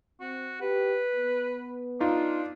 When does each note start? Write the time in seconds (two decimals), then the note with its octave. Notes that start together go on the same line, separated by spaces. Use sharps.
0.21 C4 F#4
0.61 G4 B4
1.15 B3
2.00 D4 D#4 F4